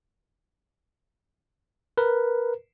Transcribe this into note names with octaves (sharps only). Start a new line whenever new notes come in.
A#4 B4